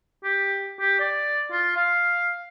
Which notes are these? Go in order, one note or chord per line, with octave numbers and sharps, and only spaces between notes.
G4
G4
D5
F4
F5